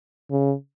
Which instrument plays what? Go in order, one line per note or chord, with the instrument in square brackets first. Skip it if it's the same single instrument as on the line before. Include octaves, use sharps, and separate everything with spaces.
[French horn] C#3